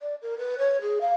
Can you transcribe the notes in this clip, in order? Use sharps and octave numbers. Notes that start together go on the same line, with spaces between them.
D5
A#4
B4
C#5
G#4
F5